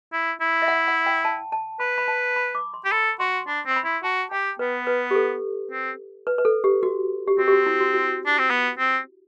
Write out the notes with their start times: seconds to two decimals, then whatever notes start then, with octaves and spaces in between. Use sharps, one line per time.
0.13 E4
0.41 E4
0.62 E5
0.68 F#5
0.88 F#5
1.06 G5
1.25 A5
1.52 A5
1.80 B4 B5
1.98 B5
2.08 A5
2.36 B5
2.55 D6
2.74 C6
2.85 G4
2.92 A4 B5
3.20 F#4 C6
3.47 D4 B5
3.66 C4 C6
3.76 B5
3.85 E4
4.03 F#4 A5
4.31 G4 G5
4.59 B3 B4
4.87 B4
5.11 G4
5.15 A4
5.71 C4
6.27 B4
6.38 B4
6.45 A4
6.64 G4
6.83 F#4
7.27 G4
7.38 C4 F#4
7.48 G4
7.53 F#4
7.66 E4
7.81 F#4
7.94 F#4
8.26 D4
8.38 C4
8.50 B3
8.79 C4